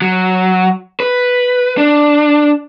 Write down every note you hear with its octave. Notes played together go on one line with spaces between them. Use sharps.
F#3
B4
D4